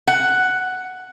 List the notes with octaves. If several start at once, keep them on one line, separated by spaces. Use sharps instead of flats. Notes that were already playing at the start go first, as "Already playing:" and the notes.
F#5